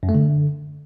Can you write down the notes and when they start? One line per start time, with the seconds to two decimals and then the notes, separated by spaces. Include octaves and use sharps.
0.03 F#2
0.09 A3
0.15 D3